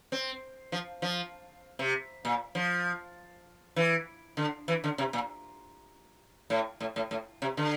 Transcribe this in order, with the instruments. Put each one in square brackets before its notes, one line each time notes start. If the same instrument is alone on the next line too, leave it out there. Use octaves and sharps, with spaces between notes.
[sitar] C4
F3
F3
C3
A#2
F3
E3
D3
E3
D3
C3
A#2
A2
A2
A2
A2
C3
D3